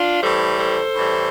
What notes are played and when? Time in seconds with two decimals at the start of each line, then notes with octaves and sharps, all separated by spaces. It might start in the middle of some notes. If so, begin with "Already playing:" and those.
Already playing: D4 F4
0.22 A2 E3 G3 A4 C5
0.59 A4 C5
0.96 A2 E3 G3